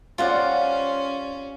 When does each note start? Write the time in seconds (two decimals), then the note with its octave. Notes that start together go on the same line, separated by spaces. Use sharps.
0.18 G3 C4 C#4 F4 D5 F5 F#5